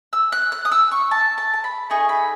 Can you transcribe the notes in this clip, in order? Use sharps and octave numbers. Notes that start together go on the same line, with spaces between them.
E6
F#6
F#6
D#6
E6
C#6
A5
A5
A5
B5
A3 D#4 G#4 C#6
B5